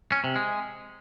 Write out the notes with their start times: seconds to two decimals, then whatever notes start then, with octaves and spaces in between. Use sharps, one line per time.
0.12 C#4
0.24 C3
0.36 G#3